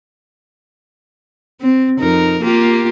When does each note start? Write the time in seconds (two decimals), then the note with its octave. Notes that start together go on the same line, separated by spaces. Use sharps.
1.61 C4
1.99 F2 D#4 A#4
2.41 A#3 F4 G4